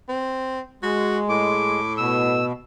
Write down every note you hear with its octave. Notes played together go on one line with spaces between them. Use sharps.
C4
G#3 F#4
A2 D6
B2 E6